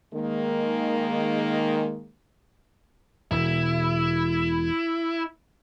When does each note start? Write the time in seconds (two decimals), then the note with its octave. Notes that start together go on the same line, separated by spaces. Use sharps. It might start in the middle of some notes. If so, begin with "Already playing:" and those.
0.14 D#3 G#3 A#3
3.31 E1 B2 E4